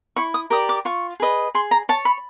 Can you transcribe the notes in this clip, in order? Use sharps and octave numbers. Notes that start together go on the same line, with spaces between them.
E4 C#6
D#6
G4 A#4 D5 D#6
D6
F4 C#6
G#4 B4 D#5
G#4 C6
A#5
C#5 A5
B5